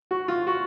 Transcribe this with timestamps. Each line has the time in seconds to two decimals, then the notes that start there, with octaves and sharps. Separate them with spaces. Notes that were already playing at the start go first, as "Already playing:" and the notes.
0.11 F#4
0.28 F4
0.47 F#4